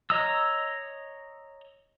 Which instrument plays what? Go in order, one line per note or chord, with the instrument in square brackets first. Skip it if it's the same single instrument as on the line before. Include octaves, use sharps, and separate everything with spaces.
[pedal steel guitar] C#5 D#5 A#5 D#6 E6